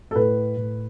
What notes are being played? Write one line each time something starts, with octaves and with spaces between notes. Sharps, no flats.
A4
A2 B4
A2